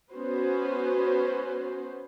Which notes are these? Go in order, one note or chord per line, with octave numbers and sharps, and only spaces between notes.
B3 C#4 F#4 B4 C5